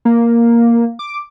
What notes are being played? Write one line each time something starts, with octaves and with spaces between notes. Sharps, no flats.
A#3
D6